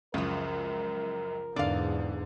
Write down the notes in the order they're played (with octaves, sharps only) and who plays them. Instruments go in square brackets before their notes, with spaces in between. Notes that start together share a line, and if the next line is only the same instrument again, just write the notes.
[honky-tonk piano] C#2 F#2 [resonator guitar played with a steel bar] C#3 F3 [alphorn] A#4
[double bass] E2 G#2 [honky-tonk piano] D3 [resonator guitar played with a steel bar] D5 F5